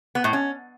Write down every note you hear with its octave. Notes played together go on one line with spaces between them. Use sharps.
B3
A2
C#4